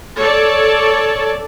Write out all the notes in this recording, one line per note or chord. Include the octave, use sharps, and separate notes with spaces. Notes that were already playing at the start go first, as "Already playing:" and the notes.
A4 C#5 D5 A5